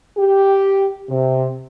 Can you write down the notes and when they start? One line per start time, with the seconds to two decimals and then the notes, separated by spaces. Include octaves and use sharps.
0.17 G4
1.09 C3